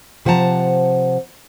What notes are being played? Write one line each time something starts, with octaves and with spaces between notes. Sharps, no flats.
C3 F3 C5 F#5 A5 A#5